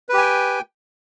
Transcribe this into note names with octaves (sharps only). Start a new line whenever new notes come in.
G4 B4 G5 G#5